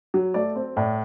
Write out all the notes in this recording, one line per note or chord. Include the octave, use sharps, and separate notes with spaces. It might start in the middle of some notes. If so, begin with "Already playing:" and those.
F#3
A3 D5
C4
A2 D5